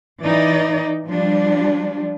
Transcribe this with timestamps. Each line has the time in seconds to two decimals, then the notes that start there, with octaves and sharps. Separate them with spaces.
0.22 E3 D#4 D5
1.06 F3 G3 D4